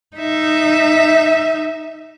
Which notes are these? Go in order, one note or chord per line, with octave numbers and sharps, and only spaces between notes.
D#4 E5